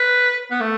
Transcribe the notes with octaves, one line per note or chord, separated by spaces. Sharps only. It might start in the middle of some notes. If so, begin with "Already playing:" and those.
Already playing: B4
B3
A3